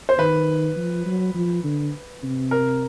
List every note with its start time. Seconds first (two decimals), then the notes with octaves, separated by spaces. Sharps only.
0.09 C5
0.19 D#3 B4
0.76 F3
1.06 F#3
1.35 F3
1.64 D3
2.23 C3
2.51 A#4